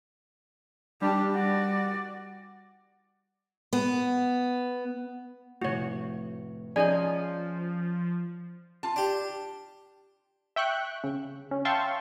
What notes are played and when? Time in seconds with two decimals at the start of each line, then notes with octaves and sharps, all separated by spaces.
1.02 G3 D4 G4
1.32 F#4 D5
3.73 B3
5.62 F1 A2 F#4 C#5
6.76 F3 C#4 D#4 G#4 C#5 D5 G#5
8.83 F4 A5
8.96 D4 G4
10.56 E5 G5 C#6 F#6
11.04 C#3
11.51 C#4
11.65 E5 F5 G5 A5 C6 C#6